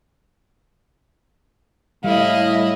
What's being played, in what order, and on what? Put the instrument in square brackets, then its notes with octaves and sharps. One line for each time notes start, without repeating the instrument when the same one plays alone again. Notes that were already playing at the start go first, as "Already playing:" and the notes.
[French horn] A2 [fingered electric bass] G3 [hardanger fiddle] E4 D#5 [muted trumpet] F5